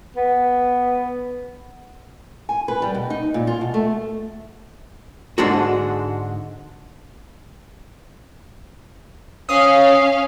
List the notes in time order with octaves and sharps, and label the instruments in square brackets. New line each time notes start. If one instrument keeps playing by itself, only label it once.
[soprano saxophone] B3
[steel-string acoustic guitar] G#5
B4
G3
B2
D#4
A#2
F4
B2
A3
[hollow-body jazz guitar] G#2 D3 G#3 D4 F#4
[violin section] C#4 F5 [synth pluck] D#6